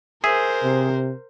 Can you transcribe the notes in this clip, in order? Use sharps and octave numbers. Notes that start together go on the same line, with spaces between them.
G#4 A#4 C5 E5
C3